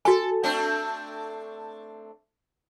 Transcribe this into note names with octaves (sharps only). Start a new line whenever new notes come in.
F#4 A4 G#5
A3 C4 D4